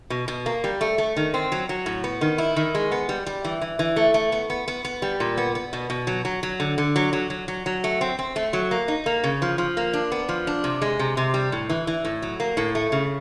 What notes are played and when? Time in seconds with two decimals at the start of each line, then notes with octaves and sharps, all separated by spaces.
0.10 B2
0.28 B2
0.46 A#3
0.64 G3
0.81 A3
0.98 A3
1.16 D#3
1.34 C4
1.52 F#3
1.69 F#3
1.86 A2
2.04 B3
2.21 D#3
2.38 E4
2.56 D#3
2.75 G#3
2.92 B3
3.09 G3
3.26 G3
3.44 E3
3.61 E3
3.79 E3
3.96 A3
4.14 A3
4.32 B3
4.50 B3
4.68 B3
4.85 B3
5.02 G3
5.20 A#2
5.37 B3
5.55 B3
5.73 B2
5.90 B2
6.07 F#3
6.25 F#3
6.43 F#3
6.60 D3
6.78 D3
6.96 F#3
7.13 F#3
7.30 F#3
7.48 F#3
7.66 F#3
7.84 A3
8.01 C4
8.19 C4
8.36 A3
8.53 F#3
8.71 A#3
8.88 D#4
9.06 A#3
9.24 C#3
9.42 F3
9.58 F3
9.77 A#3
9.93 D4
10.12 B3
10.29 F3
10.47 D4
10.64 C3
10.82 G#3
10.99 C3
11.17 C3
11.34 G3
11.52 A2
11.70 E3
11.87 E3
12.05 A2
12.22 F#3
12.40 A#3
12.57 A2
12.75 A3
12.92 C#3